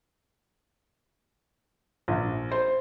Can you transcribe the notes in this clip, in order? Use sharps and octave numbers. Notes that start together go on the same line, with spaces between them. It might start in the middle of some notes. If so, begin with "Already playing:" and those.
A#1
C5